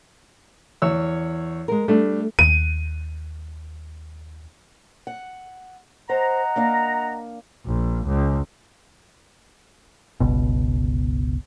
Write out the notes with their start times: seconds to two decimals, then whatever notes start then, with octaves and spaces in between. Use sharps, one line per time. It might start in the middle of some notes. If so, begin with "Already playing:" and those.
0.82 E2 C#5 E6
1.68 G#3 A#4
1.88 G3 A3 D4
2.39 D#2 D#7
5.07 F#5
6.09 C5 D#5 F#5 A#5
6.56 A#3 D4 F5
7.65 A#1
8.06 C#2
10.20 G1 C#2 B2